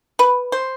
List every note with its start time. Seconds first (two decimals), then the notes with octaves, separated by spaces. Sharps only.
0.19 B4
0.52 C5